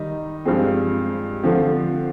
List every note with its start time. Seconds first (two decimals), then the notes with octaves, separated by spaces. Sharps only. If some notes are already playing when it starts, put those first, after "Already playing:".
Already playing: D#3 G3 D#4
0.45 G2 F3 G#3 C4
1.43 D3 F3 C4